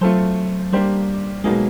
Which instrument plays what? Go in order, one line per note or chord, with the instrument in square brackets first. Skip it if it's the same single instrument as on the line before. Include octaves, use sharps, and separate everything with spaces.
[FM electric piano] F#3 [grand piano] A3 C4 F4 A4 C5
[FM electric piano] G3 [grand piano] A#3 D4 G4 C5
[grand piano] B2 F#3 A#3 D#4 G#4 [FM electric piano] G#3